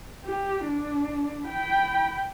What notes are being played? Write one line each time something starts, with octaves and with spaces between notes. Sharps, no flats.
G4
D4
G5 B5